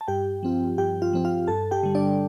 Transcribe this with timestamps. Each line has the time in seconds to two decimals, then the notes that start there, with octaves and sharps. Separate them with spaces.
0.01 A5
0.08 G2 G4 G5
0.43 F3 C4 F4
0.78 G2 G4 G5
1.02 F4 F5
1.13 F3 C4 F4
1.25 F4 F5
1.48 G2 A4 A5
1.71 G4 G5
1.83 D3 G3
1.95 D4 D5